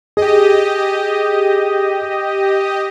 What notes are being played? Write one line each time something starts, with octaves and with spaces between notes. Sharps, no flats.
G4 G#4 D#5